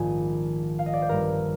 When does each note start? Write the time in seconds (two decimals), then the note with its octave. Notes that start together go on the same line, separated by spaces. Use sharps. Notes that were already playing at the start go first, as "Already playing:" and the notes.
Already playing: A#1 G#2 D#3 G#5
0.79 F5
0.86 D#5
0.93 D5
1.02 C5
1.09 G1 G2 D#3 A#4